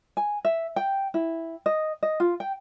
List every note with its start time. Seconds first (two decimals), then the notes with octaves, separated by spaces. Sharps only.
0.17 G#5
0.45 E5
0.76 G5
1.14 E4
1.66 D#5
2.03 D#5
2.20 F4
2.40 G5